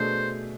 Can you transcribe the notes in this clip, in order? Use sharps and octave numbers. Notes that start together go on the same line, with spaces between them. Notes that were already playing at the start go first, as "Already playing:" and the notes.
Already playing: B2 A3 D4 G#4 C5